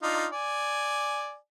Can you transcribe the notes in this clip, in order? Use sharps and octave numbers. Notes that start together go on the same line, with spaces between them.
D4 D#4 F4
D5 G#5